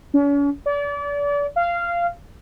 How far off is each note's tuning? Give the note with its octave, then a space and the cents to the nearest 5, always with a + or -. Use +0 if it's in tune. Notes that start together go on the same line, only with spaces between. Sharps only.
C#4 +40
D5 -35
F5 -15